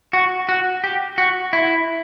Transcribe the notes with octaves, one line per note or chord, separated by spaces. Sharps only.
F#4
F#4
G4
F#4
E4